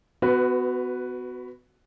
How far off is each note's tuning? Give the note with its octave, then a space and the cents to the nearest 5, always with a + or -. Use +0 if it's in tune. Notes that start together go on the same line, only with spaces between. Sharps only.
B3 +30 F#4 +0 B4 +0